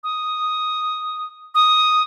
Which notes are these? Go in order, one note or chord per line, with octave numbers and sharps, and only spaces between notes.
D#6
D#6